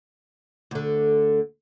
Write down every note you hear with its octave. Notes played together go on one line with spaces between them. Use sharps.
D2 D3